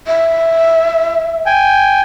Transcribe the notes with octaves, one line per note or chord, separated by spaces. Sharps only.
E5
G5 G#5